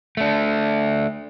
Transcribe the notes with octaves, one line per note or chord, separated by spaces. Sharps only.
A3 D4